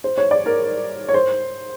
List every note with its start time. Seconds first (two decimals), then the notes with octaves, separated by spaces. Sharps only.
0.04 C5
0.17 C#5
0.31 D5
0.46 A#4
1.09 C#5
1.14 C5